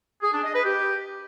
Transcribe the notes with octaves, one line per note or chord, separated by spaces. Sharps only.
G#4
D4
D#5
B4
G4